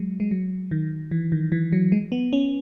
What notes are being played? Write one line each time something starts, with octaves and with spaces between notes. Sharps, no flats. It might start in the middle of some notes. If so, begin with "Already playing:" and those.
Already playing: F#3 G#3
G#3
F#3
D#3
E3
D#3
E3
F#3
G#3
B3
C#4